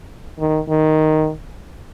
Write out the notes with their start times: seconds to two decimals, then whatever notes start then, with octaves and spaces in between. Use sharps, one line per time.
0.40 D#3
0.69 D#3